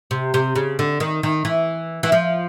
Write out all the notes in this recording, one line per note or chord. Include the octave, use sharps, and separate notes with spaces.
C3
C3
C#3
D3
D#3
D#3
E3
E3
F3